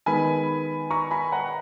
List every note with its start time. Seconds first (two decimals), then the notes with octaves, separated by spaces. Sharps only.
0.06 D#3 G#3 B3 G#5 B5
0.90 A#5 C#6
1.11 G#5 B5
1.32 F#5 A#5